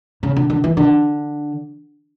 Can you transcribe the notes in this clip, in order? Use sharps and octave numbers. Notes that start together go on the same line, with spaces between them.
C#3
D3
D3
E3
D3